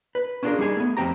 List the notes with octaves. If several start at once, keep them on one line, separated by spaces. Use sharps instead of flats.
B4
C#4 D4 F4 F#4 G#4 A#4
G3 D#4 G#4 G#5
A3 B3
F2 G#2 C4 G4 A#5